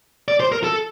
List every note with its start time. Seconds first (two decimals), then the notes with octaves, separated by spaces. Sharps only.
0.28 D5
0.40 C5
0.52 A#4
0.64 A4